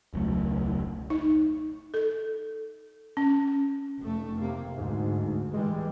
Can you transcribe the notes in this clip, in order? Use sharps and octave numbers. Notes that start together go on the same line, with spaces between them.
E1 C#2 F#3 A3
D#4
A4
C#4
F1 A3
C3 A#3
D2 G#2
E3 G3 G#3